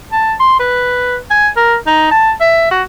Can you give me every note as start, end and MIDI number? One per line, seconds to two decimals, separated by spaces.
0.12 0.33 81
0.39 0.57 84
0.59 1.16 71
1.30 1.48 80
1.56 1.75 70
1.87 2.09 63
2.11 2.31 81
2.40 2.66 76
2.71 2.82 66